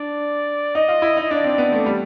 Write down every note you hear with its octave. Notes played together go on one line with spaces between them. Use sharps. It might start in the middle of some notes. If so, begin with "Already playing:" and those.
Already playing: D4 D5
D#4 D#5
F4
E4
D#4
D4 D5
C4
B3
A3
G3